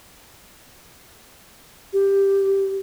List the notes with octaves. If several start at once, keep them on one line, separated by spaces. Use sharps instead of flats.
G4